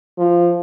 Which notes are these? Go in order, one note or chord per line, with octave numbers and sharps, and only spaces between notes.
F3